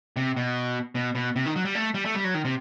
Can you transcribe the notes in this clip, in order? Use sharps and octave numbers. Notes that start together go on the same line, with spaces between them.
C3
B2
B2
B2
C3
D#3
F#3
G3
A3
G3
A3
G3
F#3
D#3
C3